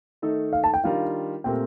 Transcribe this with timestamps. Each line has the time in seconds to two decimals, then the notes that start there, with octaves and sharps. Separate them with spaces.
0.22 D#3 A3 D#4 A4
0.53 F5
0.64 A5
0.74 G5
0.84 D#3 G3 D4 F4 A#4 F5
1.44 A#2 A3 C4 G4 A#4 G5